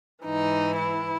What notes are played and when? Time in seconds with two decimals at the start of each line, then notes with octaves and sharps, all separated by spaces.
0.24 G#2 E3 D#4
0.77 E4